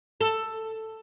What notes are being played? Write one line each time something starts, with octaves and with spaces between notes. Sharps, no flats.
A4